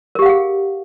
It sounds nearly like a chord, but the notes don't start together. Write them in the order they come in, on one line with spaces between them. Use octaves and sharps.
A#4 G4 F5 F#5 G#4